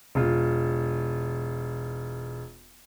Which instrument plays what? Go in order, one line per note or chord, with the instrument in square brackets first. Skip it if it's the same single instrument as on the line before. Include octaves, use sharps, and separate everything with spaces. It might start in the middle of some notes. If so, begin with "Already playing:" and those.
[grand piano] E1 F4